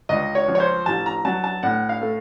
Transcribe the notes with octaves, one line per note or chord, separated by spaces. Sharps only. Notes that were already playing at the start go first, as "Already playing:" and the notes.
C#2 D#5
C#5
F3
C#5
C5
A1 A5
A#5
F#3 A5
A5
A2 F#5
F5
A3